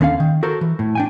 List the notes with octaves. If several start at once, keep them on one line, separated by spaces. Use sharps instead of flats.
D#2 D3 C#4 F5
D#3
F#4 A4 A#4 C5
E3
A2
D4 G5 G#5